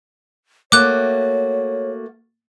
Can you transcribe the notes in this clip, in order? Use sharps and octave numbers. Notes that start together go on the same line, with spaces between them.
A3 A#3 F#4 C#5 D6 F#6